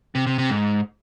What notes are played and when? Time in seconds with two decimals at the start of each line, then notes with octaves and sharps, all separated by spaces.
0.15 C3
0.27 C3
0.38 C3
0.50 G#2